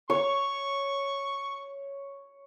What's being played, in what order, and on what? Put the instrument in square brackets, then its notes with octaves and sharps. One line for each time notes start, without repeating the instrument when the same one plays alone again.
[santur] C#5 [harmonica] C#6